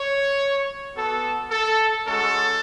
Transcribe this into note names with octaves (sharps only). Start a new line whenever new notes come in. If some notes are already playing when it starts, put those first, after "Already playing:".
Already playing: C#5
B3 F#4 A4
A4
G#3 C#4 F#4 A4